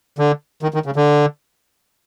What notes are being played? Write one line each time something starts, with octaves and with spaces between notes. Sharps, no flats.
D3
D#3
D#3
C#3
D3